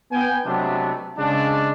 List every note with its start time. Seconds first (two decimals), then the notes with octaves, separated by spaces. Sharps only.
0.12 B3 G5 G#5
0.45 C3 F#3 G#3 A3 B3 D4
1.18 C#3 G#3 C4 D4